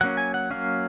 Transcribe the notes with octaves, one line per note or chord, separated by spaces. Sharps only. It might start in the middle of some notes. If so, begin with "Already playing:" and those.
F#3 A#3 C#4 F#5
G#5
F#5
F#3 A#3 C#4 F5